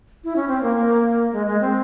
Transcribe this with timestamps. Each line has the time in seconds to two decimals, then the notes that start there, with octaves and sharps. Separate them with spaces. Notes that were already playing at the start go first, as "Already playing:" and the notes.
0.24 E4
0.36 C#4
0.48 C4
0.63 A#3
0.76 A#3
1.33 G#3
1.47 G#3
1.61 C4